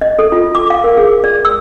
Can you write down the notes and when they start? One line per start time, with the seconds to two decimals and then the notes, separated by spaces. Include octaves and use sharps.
0.01 D#5
0.19 A4
0.32 F4
0.55 D6
0.70 F5
0.84 A#4
0.97 G#4
1.24 D5
1.45 E6